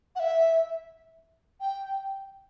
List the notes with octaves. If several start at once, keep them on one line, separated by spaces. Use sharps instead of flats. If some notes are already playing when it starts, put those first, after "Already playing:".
F#5
E5
G5